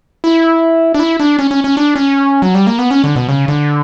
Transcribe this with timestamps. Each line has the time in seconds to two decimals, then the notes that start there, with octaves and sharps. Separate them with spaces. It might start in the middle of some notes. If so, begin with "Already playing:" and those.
0.24 E4
0.94 D4
1.00 E4
1.20 D4
1.39 C#4
1.51 C#4
1.64 C#4
1.77 D4
1.96 C#4
2.42 F#3
2.55 G3
2.67 A#3
2.79 B3
2.91 C#4
3.04 D3
3.16 B2
3.28 C#3
3.48 D3